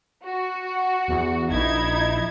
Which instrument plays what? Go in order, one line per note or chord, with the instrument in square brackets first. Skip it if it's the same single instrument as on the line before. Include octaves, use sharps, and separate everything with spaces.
[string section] F#4
[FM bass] E2
[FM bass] A#1 [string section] D#4 E4 G#6